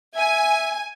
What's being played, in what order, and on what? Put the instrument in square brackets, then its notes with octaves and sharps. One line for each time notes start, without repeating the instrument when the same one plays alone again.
[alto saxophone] E5 [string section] G#5